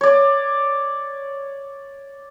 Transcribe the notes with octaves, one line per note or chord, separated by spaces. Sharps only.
C#5 D5